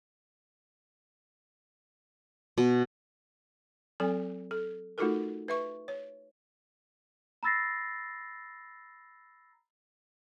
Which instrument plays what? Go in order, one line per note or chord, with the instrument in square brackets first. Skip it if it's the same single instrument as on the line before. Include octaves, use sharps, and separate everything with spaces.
[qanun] B2
[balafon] F#3 C4 A4 G#5
A4
A3 D#4 F4 F#4 A4 A#4
B4 E5 C#6
C#5
[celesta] A#5 B5 E6 A6 A#6 C7